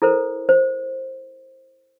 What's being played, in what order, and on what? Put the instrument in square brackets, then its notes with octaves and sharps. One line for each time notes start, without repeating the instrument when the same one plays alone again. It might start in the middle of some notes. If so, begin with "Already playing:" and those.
[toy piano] E4 A4 A#4 C5
C5